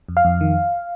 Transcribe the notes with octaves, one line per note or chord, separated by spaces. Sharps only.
F2
F5
F2
D#3